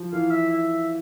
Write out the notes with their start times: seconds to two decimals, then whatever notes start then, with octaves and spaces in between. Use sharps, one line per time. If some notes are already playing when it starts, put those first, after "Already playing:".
Already playing: F3
0.12 E3 F5
0.31 E5
0.50 E5